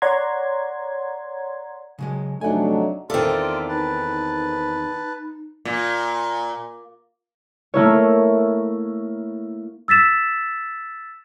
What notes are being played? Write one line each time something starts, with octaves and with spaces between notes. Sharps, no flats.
C#5 D5 F#5 A#5 C6 G#6
C#3 F#3 G#3
F2 C3 F#3 A3 D4 D#4 F#5 G#5
E2 D#3 C4 F4 A4 D5 E5 C6
D#4 B4 A5
A#2
A3 A#3 E4 C#5
E6 A6 B6 E7